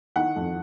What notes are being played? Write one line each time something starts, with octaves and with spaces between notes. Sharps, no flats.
D#3 F#5
F2